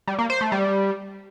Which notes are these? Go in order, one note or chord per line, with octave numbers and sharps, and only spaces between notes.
G3
A#3
C5
A3
G3